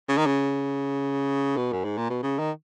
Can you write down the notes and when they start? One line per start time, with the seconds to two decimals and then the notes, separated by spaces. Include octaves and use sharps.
0.09 C#3
0.18 D#3
0.26 C#3
1.57 B2
1.72 F#2
1.85 G#2
1.98 A#2
2.10 B2
2.23 C#3
2.39 D#3